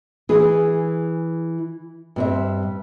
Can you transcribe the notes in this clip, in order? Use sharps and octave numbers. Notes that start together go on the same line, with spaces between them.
E3 G#4
G2 C4 E5